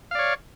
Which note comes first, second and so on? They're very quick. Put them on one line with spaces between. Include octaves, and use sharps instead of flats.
F5 D5 C#5